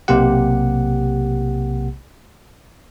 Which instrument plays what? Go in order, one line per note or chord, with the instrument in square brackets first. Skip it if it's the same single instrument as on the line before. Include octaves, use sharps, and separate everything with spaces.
[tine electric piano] B1 C3 A#3 G4 F#5